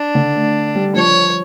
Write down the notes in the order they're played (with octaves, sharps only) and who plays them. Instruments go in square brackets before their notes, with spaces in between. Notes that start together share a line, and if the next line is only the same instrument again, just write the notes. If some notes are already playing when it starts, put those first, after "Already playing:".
Already playing: [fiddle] D4
[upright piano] D3
A3
G3
[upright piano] F3 [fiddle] C#5